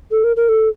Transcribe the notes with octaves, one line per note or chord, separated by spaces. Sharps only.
A4
A#4
A#4
A4